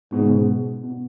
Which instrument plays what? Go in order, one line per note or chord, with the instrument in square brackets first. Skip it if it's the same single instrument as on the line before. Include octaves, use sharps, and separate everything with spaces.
[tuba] G#2 [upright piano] B2
[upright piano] C#3
B2
B2